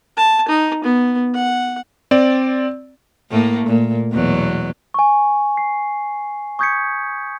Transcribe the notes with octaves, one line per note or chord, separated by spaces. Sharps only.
A5
D#4
B3
F#5
C4 D5
A2 A3 A#3
A#2
E2 B2 F#3
G#5 C#6
C7
C#6 D#6 G6 G#6 B6 C#7